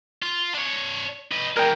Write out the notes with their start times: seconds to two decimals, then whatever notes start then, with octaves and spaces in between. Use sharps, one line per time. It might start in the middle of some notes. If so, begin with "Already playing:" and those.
0.22 F4
0.55 D4 C#5
1.32 D#4 B4
1.57 E3 G#3 A#4 G5